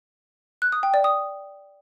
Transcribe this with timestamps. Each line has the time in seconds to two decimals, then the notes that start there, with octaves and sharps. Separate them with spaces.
0.62 F#6
0.72 D#6
0.83 G5
0.94 D5
1.04 D#6